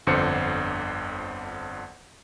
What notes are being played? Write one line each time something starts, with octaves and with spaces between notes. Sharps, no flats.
G1 F2 D3 C5 C#7